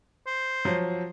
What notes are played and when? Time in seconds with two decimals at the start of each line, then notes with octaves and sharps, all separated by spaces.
0.27 C5
0.65 F3 F#3